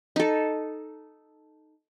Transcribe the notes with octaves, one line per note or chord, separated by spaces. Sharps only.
D#4 A4